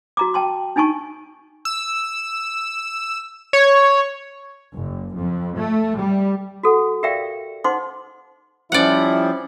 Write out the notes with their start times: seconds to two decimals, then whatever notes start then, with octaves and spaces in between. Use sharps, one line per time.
0.17 F#4 A#5 D6
0.34 G5 A5 C6
0.76 D4 D#4 G#5 A5 C#6
1.65 E6
3.53 C#5
4.74 F#1
5.15 F2
5.57 A3
5.96 G3
6.63 F#4 A4 F#5
7.03 G4 A#4 D5 E5 F5 G5
7.64 D#4 C5 F#5 C6 D6
8.72 F3 G3 C#4 E4 D5 F#5